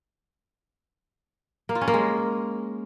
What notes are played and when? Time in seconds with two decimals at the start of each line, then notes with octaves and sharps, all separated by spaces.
1.69 A#3
1.75 F4
1.81 C#4
1.88 A#3
1.94 G#3